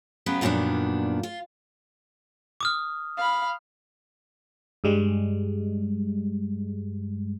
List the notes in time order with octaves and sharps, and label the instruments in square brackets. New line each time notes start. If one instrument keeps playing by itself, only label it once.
[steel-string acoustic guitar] C#3 F#3 B3 G4 B4
F#2 A#2 D#3 F3 B3 D4
F4
[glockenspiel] D6 D#6 F6
[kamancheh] F5 B5
[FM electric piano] G2 G3 G#3